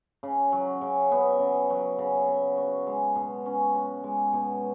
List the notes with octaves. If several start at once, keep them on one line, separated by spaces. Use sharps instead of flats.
C#3
F#3
C#3
B3
C#3
F#3
C#3
B3
F#4
G#3
B2
C#4
F#4
G#3
B2